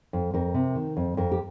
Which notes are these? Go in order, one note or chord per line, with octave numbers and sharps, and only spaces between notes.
F2
F2 A#4
C3
D#3
F2
F2 A#4
G4